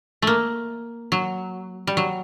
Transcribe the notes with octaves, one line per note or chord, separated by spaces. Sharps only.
A3 A#3
F#3
G3
F#3